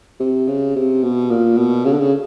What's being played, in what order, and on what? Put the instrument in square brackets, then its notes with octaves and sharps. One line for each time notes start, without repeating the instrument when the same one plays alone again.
[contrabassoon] C3
C#3
C3
B2
A#2
B2
C#3
D3
C#3